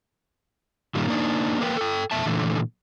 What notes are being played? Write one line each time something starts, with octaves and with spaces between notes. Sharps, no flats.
G2 A#2 D#3 G3
A#3 D4 D#4
A#3 A#4 B4 E5 G5
A4 G5
F2 B2 E5 A5
A#2 D3 E3 A3